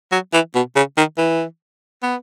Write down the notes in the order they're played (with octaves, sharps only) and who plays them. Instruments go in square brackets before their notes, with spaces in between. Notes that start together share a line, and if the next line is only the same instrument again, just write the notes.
[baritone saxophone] F#3
E3
B2
C#3
D#3
E3
B3